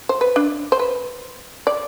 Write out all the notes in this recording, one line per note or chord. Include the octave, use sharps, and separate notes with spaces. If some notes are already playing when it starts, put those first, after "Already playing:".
C5
B4
D4
C5
B4
D5